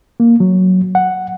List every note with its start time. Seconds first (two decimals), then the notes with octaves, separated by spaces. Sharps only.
0.20 A#3
0.40 F#3
0.95 F#5